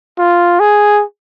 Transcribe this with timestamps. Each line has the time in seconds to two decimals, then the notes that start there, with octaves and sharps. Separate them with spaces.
0.19 F4
0.60 G#4